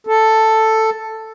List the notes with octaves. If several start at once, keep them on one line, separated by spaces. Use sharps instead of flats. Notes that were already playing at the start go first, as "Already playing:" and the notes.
A4